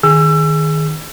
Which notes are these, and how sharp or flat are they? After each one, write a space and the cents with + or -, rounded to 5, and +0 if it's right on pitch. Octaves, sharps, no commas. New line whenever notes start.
D#3 +0 G#4 +0 E6 +30